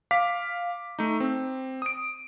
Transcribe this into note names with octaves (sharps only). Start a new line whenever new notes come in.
F5 D6 B6
A3 D#4
C4
D#6 D7